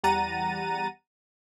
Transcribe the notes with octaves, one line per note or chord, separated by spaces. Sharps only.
E2 G3 F#5 A#5 A6 D#7